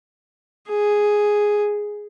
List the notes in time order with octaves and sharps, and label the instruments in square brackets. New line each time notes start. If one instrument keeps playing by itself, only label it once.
[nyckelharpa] G#4